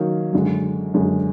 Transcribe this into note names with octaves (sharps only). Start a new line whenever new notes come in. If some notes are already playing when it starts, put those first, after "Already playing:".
Already playing: D#3 F#3 A#3
F#2 D3 G#3
F#2 D3 G#3